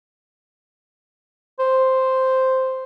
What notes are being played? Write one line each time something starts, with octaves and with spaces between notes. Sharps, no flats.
C5